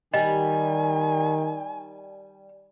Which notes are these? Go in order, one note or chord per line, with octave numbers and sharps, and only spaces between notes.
D#3 G3 D#5 G#5